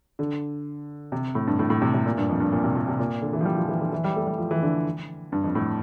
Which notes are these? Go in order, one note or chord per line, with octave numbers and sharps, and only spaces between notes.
D3
C3
A2
G2
A2
A2
C3
C3
A#2
G2
F2
G2
A#2
C3
A#2
C3
A#2
D3
E3
F3
G3
F3
E3
D3
E3
G3
A3
G3
F3
E3
D3
G2
F2
A2